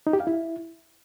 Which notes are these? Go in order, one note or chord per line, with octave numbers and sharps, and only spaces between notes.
D#4
G4
F5
E4